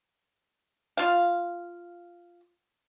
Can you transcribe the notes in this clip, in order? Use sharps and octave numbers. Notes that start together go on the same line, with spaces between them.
F4 F5